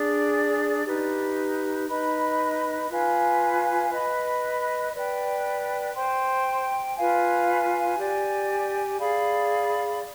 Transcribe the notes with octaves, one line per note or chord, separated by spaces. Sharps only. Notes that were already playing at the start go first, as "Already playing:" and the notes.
Already playing: D4 G#4 D5
D#4 G4 B4
D#4 B4 D#5 B5
F4 B4 F5 G#5
B4 D#5 B5
B4 D5 G5
C5 G5 C6
F4 B4 F5 G#5
G4 D5 G#5
G#4 D5 F5 B5